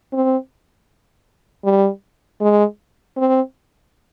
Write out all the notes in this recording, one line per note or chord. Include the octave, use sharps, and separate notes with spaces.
C4
G3
G#3
C4